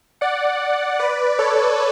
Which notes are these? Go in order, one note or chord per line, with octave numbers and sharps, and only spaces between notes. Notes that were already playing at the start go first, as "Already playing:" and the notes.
D5 F#5
B4 D5
A4 C#5